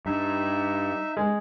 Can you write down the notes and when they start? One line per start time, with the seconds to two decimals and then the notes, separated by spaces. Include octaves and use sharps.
0.06 G2 D#4 E5
1.17 G#3